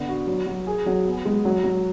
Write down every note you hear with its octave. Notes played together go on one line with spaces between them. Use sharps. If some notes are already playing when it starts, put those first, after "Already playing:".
Already playing: D3 B3
F#4
F#3
F#3
G#4
F#3
B3
G#3
F#3
F#3